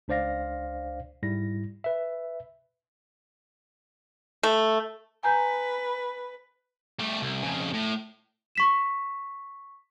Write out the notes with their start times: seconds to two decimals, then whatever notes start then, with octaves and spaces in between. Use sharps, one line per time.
0.08 C#2 D4 C5 D5 F5 A#6
1.23 G#2 G3 E4 A#6
1.84 B4 E5
4.43 A3
5.23 B4 G#5 A#5 G6
6.99 G3 A3
7.22 C2
7.43 F2 C#3
7.74 A2
8.55 C#6 B6 E7